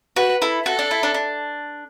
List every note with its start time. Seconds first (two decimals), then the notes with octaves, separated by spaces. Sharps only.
0.16 F#4 B4
0.42 E4 A4
0.65 F#4 A4
0.79 D4
0.91 E4
1.03 D4
1.14 D4